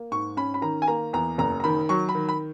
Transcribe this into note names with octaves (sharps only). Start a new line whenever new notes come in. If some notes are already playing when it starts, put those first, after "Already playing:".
Already playing: A#3
G#2 C#6
C#4 B5
B5
D#3 A#5
G#5
A#3 A#5
E2 A#5
F#1 A#5
A#5
D#3 B5
F#3 C#6
B5
D#3
B5